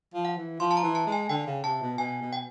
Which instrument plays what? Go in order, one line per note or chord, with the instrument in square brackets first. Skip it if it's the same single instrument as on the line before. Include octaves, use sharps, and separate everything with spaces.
[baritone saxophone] F3
[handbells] F#5
[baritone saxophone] E3
[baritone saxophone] F3 [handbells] C6
[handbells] A5
A#5
[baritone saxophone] E3
[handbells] A5
[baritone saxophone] G#3
[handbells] G#5
[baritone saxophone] D3 [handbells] G5
[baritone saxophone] C#3
[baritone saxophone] C3 [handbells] A5
[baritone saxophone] B2
[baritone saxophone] B2 [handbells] G#5
[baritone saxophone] B2
[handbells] G5